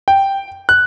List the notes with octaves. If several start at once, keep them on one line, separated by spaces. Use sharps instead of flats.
G5
F#6